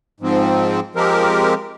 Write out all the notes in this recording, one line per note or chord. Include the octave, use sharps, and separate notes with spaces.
G#2 F3 C4
F3 G#3 C4 G4 A#4